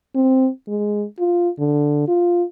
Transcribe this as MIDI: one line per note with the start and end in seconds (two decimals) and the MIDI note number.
0.15 0.49 60
0.68 1.05 56
1.19 1.49 65
1.59 2.04 50
2.08 2.43 65